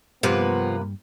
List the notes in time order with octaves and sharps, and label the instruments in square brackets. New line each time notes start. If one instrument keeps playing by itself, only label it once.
[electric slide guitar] G2 [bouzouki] C3 A#3 B4 [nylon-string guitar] F3 [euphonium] B3